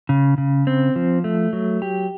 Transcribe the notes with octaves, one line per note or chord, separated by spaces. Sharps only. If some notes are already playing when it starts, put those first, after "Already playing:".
C#3
C#3
C4
F3
A3
F#3
G4